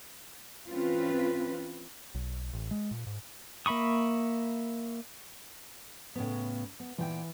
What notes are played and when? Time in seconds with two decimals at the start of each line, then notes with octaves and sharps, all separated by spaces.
0.69 E3 C4 C#4 F4 B4
2.15 B1
2.53 A1
2.71 G#3
2.91 A#2
3.07 G#2
3.66 A#3 E5 B5 C#6 D#6
6.15 A2 C#3 B3
6.80 B3
6.98 A#2 E3 B3 G5